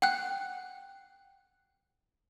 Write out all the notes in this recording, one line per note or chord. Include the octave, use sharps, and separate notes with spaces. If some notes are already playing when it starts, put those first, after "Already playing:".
F#5 G5 F#6